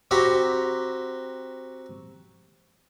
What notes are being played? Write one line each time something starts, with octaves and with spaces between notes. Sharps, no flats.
C4 F#4 G4 F#5 A#5 B5